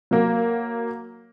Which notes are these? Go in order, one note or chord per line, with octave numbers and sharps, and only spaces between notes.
F#3 A#3